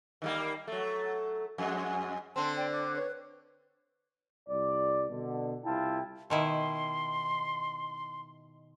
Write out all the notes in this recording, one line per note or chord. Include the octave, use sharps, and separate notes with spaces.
D#3 G3 A#3
F#3 A3
F2 G#3
D3 C4 A5 C6
D5 G5
D6
B4 C#5
C2 D5
B2 D3
C2 E4 F4 G5 A5
B2 D#3 E4 C6